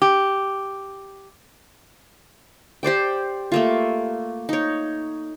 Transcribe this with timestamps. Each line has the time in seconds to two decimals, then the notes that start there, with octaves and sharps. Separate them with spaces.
0.02 G4
2.83 G4 C5 D5 G5
3.52 A3 A#3 F4
4.49 D#4 C#5